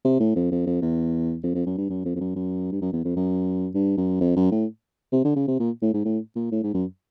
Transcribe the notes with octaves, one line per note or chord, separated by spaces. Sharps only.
C3
A2
F2
F2
F2
E2
F2
F2
F#2
G2
F#2
F2
F2
F#2
F#2
G2
F#2
E2
F2
F#2
G2
F#2
F2
F#2
A2
C3
D3
C#3
C3
A#2
A2
G#2
A2
A#2
A2
G#2
F#2